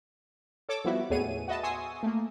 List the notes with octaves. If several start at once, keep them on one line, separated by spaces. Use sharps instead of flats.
A4 C#5 D6 E6
F3 G3 B3 E4 F#4
D#2 A2 B3 G#4 C#5 D#7
F#4 B4 D#5 E5 A5
G#5 C6 C#6 D#6 E6
A3 A#3